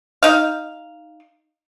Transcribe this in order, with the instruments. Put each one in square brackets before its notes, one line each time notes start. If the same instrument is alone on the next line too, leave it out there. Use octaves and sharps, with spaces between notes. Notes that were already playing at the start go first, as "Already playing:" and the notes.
[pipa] D#4 F5